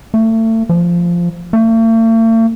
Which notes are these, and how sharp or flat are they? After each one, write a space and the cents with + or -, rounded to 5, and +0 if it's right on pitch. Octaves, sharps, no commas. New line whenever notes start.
A3 +30
F3 -10
A3 +45